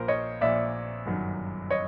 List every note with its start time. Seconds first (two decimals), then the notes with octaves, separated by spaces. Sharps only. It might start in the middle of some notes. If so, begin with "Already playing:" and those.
Already playing: A#1 A#2 F3 A#4 C5
0.08 C#5 D#5
0.41 A#1 A#2 F3 D5 E5
1.06 G1 F#2 D#3 F#3
1.71 C#5 D#5